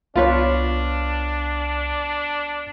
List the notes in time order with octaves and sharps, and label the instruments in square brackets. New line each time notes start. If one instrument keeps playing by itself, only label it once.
[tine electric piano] C2 [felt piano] B3 F5 [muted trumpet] D4 [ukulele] F4 B4 C#5